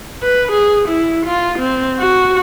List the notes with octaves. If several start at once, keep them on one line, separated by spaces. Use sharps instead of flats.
B4
G#4
E4
F4
C4
F#4